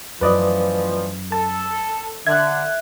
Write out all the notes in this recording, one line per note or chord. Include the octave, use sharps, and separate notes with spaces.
F#2 A2 E3 F3 B4 D5 D#5
A4 A5
D3 E5 F#6 G#6